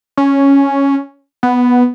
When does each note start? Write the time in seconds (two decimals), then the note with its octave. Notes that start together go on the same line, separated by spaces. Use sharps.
0.17 C#4
1.43 B3